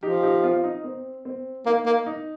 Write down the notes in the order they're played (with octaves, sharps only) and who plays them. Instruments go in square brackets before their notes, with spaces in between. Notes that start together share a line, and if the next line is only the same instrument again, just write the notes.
[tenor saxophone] F3 [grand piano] D#4 G4
[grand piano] D#4 G4
C4 F4
D#4
C4
C4
[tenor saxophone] A#3 [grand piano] D#4
[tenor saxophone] A#3
[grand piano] D#4